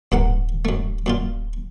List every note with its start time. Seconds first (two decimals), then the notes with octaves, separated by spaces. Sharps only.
0.12 D1 G2 A#3 F#5
0.65 F#2 A3
1.06 F#2 A#2 F4